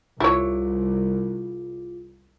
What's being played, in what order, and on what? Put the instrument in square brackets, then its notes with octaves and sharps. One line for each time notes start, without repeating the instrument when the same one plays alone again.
[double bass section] C2 [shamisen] E4 C#5 [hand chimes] F4 G#4